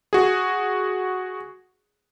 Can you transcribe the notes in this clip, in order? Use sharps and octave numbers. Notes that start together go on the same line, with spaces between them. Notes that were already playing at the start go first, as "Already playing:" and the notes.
F#4 G#4